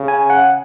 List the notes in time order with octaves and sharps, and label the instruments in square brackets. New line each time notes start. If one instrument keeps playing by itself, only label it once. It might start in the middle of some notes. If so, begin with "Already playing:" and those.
Already playing: [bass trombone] C#3
[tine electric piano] G#5
F#5